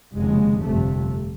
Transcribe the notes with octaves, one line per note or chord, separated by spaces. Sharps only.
F1 D#2 C#3 G#3
G1 F2 C3 A3